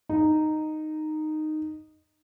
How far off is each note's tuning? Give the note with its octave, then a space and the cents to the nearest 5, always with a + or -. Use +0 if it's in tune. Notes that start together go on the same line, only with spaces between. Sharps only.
D#4 -10